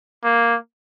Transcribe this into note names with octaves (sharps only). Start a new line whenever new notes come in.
A#3